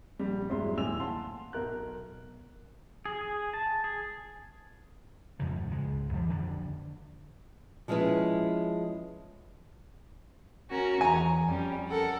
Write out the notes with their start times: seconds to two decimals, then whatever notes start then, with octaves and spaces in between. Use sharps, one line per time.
0.19 A#1 G3
0.49 E2 G2 F#3 G#3 E4 C6
0.77 D#2 A2 G#5 E6 F7
0.98 F5 F#5 A5 C6
1.53 B1 A#4 F#6
3.06 G#4
3.21 G#4
3.54 A5
3.84 G#4
5.39 F2 G#2 C#3 F3
5.71 C#2 G#3
6.13 F2 E3
6.29 F2 D3 F3 D4
7.88 F3 G#3 C#4 E4 B4
10.70 C#4 F#4 A#4
11.01 E2 G#5 A#5
11.46 F2 G3 C#4
11.87 A4 A#4 F#5